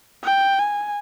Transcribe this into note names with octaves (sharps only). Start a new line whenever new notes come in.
G5
G#5